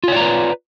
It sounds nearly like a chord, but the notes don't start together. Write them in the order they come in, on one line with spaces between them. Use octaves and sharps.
F4 C#5 D5 A#5 B4